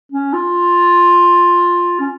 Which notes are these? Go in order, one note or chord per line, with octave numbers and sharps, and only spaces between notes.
C#4
F4
C#4